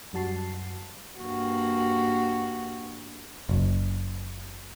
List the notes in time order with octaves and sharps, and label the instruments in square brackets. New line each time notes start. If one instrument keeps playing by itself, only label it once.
[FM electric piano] F#2 G3 F#4 A5 C7
[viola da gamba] G2 A#3 F#4
[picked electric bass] F#1